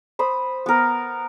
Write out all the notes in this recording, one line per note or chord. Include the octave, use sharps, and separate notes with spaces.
C5 B5 D#6
B3 A#4